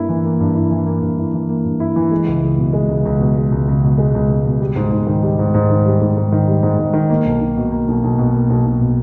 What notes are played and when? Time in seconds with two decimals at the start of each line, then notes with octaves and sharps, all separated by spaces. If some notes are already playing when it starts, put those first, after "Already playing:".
Already playing: G2 A#3 E4
0.09 E3
0.25 A#3
0.40 G2
0.55 E4
0.71 E3
0.87 A#3
1.02 G2
1.18 E4
1.34 E3
1.49 A#3
1.65 G2
1.80 E4
1.96 E3
2.12 G#3
2.27 C#2
2.43 C#2
2.58 B2
2.73 G#3
2.89 C#2
3.05 C#2
3.20 B2
3.36 G#3
3.52 C#2
3.68 C#2
3.83 B2
3.98 G#3
4.14 C#2
4.29 C#2
4.46 B2
4.61 G3
4.76 G#2
4.92 G#2
5.07 D#3
5.23 G3
5.39 G#2
5.54 G#2
5.70 D#3
5.86 G3
6.01 G#2
6.17 G#2
6.32 D#3
6.48 G3
6.63 G#2
6.79 G#2
6.93 D#3
7.09 A#3
7.25 B1
7.41 B1
7.57 B2
7.72 A#3
7.88 B1
8.04 B1
8.18 B2
8.35 A#3
8.50 B1
8.66 B1
8.81 B2